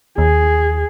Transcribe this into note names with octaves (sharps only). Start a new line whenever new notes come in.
D#2 G#4